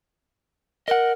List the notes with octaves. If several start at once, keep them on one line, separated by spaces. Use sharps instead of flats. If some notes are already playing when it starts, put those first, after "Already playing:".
A#4 D#5 F#5